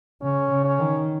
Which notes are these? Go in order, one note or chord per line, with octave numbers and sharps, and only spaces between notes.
C#3 C#4
C#3
C#4
D#3